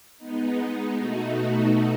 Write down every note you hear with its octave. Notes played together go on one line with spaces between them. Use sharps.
G#3 B3 D#4
B2 A3 D#4 F#4